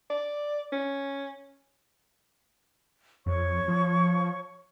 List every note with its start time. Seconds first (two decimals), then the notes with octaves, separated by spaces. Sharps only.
0.10 D5
0.72 C#4
3.26 F2 C#5 C#6
3.68 F3